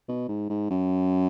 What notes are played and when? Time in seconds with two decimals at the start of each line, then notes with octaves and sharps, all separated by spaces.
0.09 B2
0.28 G#2
0.50 G#2
0.71 F#2